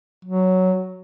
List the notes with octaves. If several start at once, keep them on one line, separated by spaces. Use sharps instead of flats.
F#3